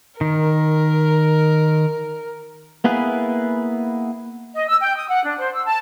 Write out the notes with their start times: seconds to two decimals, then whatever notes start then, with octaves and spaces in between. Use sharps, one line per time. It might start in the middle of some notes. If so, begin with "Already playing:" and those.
0.21 D#3 A#4
2.84 A#3 B3 E4 G#4 B4
4.54 D#5
4.68 E6
4.80 G5
4.96 D#6
5.08 F#5
5.25 D4
5.39 C5
5.54 E6
5.65 A5